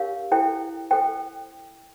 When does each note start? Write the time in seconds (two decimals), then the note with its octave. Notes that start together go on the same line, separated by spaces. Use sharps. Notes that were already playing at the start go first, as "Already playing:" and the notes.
Already playing: D4 G4 A#4 C#5 F5
0.32 E4 A4 C5 G5
0.91 A4 C5 G5